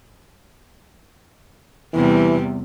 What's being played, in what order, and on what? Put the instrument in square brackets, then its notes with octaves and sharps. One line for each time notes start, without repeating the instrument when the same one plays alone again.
[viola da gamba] E2 C3 G3 [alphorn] E3